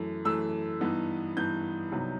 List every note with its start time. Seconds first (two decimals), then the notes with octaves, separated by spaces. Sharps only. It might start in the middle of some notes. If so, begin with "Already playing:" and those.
Already playing: F#2 E3 A3
0.25 F#2 E3 A3 E6
0.81 G2 E3 B3 D#4
1.36 G2 E3 B3 D#4 G6
1.92 C2 C3 F#3 B3 D#4